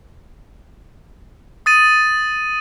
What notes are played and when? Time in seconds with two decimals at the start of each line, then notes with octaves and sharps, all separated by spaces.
1.66 D#6 A6 D#7